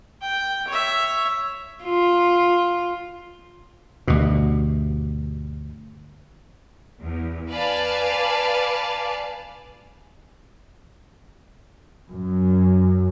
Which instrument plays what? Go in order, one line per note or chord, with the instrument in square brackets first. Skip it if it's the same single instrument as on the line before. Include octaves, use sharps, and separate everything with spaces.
[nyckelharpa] G5
C#5 E5
[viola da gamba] F4
[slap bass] D2 G2 B2
[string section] E2
B4 D5 F5 G#5 A5
[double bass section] F#2